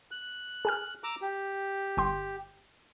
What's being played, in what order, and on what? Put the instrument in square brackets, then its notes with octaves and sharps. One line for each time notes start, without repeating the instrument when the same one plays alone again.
[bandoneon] F#6
[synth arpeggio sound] G#4 G#5 F6
[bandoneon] A#5 D6 E6
G4
[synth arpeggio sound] G1 G5 C6